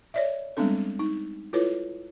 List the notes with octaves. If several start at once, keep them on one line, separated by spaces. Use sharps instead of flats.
C#5 D5 E5
G3 G#3 B3 C4 D4 A4
D#4
E4 F4 A4 B4 C#5